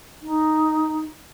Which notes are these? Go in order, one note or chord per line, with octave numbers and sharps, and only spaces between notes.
D#4